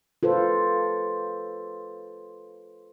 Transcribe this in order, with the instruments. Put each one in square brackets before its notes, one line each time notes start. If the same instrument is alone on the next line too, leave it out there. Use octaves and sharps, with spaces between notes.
[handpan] F4 A4 B4 C5